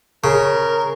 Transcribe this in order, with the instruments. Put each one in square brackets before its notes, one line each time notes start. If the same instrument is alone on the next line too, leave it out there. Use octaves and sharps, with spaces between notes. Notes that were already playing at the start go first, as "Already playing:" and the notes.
[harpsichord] C#3 [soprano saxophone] A#4